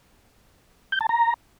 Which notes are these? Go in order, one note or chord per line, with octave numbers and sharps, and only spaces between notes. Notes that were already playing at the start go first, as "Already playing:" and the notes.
G6
A5
A#5